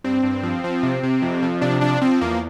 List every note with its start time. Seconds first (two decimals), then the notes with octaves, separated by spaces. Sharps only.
0.04 G2 C4
0.23 G2
0.43 F3
0.64 F3
0.83 C3
1.03 C3
1.22 F2
1.43 F3
1.61 C3 D4
1.81 F3 D4
2.02 F3 C4
2.21 E2 A#3